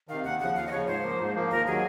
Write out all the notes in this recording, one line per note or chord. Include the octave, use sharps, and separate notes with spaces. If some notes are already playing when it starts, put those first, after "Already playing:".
C3 D#3 F5
D#2 F#5
C#3 F3 F#5
D#2 F5
D#5
C#3 F3 C#5
G#2 C5
F3 A#3
G#2
F3 A#3
D#2 A#4
D#3 F#3 G#4